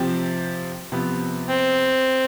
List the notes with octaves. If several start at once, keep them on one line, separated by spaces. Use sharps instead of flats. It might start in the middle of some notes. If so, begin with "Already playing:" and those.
Already playing: C3 F3 C4 G4
C3 F3 B3
C4